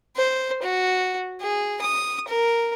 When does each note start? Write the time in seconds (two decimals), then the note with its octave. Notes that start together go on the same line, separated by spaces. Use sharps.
0.16 C5
0.63 F#4
1.41 G#4
1.82 D#6
2.28 A#4